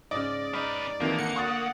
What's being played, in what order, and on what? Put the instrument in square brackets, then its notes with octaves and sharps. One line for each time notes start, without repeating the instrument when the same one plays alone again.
[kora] G#2 C#3 [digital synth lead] D5 [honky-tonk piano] D#5
[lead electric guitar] C#4 B4 [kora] D#4 F5
[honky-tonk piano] F2 D#3 E3 [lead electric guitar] A#3
[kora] D3 [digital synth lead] C#7
[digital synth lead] F#5 [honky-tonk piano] C#6 D#6 A6